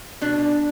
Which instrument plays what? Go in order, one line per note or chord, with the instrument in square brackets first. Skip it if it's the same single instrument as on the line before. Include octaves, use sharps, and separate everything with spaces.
[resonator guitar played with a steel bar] B2 D4